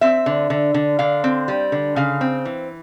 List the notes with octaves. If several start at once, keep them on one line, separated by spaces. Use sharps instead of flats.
C4 E5
D3
D3
D3
D3 F5
C4
G3
D3
C#3 F5
C4
E3